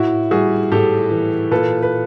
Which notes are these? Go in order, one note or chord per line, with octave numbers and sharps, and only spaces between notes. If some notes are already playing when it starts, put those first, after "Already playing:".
Already playing: A2 E4 F#4
G3 F#4 G#4
A2 G4 A4
E3
A#2 A4 B4
B4